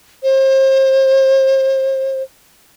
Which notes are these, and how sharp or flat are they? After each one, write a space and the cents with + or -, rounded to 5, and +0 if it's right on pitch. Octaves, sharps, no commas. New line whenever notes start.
C5 +35